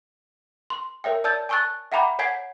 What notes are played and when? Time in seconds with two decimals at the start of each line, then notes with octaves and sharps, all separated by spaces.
0.70 C6
1.04 A#4 C#5 E5 G5
1.24 D5 A5 E6 G6 A6
1.49 G#5 A5 C#6 E6 F#6 A6
1.92 E5 F#5 G5 A#5 B5 D6
2.19 C#5 F#5 G#5 G#6 B6 C7